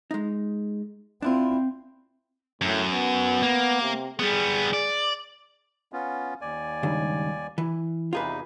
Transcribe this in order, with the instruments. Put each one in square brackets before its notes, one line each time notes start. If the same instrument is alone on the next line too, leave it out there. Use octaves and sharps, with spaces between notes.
[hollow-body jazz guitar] G#3 D#4
[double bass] C4 [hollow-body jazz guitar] D4 E4 F4
[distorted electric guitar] F#2 [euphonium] A2
[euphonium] B3
[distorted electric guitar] A#3
[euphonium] C3
[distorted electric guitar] G3 B3 [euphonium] G#4
[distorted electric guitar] D5
[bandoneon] B3 C#4 F4
D#2 D5 G#5
[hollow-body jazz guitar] C#2 G2 D#3
E3
[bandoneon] E2 C3 D#4 [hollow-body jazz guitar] F4 G#4 B4